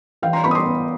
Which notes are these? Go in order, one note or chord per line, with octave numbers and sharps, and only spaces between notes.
E3 F5 G5
A#5 C6
B3 B5 C#6
D#6
C6 D6
B3